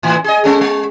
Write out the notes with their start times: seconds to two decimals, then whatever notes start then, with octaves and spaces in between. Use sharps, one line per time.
0.03 A2 E3
0.24 G#4 D#5
0.44 G#3 C#4 A4
0.61 G#3